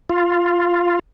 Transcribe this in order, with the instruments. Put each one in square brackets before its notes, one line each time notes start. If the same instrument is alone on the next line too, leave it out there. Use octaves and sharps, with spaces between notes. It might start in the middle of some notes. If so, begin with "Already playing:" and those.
[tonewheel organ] F4